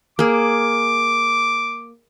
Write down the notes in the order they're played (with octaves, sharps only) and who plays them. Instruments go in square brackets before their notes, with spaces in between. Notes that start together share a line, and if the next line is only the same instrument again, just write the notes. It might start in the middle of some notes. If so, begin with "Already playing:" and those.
[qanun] A#3 G#4 [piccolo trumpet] D6